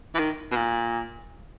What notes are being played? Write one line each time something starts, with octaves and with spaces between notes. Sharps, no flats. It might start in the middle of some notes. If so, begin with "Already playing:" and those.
E3
D#3
B2
A#2